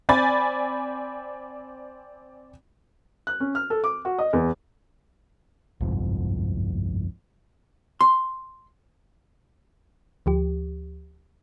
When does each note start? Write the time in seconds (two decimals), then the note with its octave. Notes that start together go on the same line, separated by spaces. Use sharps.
0.09 C4 D5 G#5 B5 A6
3.27 F#6
3.40 C#4
3.55 F6
3.70 A4
3.84 D6
4.05 F#4
4.18 D#5
4.33 E2
5.81 G1 C2 F2 G#2
8.01 C6
10.26 D2 F3 G4